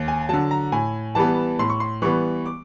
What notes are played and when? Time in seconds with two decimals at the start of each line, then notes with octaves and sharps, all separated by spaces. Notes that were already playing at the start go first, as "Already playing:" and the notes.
Already playing: D#2
0.08 G#5
0.29 D3 F#3 A5
0.51 A#5
0.72 A2 G#5
1.15 E3 G3 B3 A5
1.59 A2 C6
1.70 C#6
1.80 C6
2.02 E3 G3 B3 C#6
2.46 D6